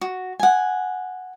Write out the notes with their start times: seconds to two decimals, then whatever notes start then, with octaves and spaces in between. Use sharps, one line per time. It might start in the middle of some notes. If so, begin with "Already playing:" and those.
0.01 F#4
0.40 F#5 G#5